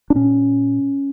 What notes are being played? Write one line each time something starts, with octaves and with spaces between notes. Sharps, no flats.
D4
A#2 C#4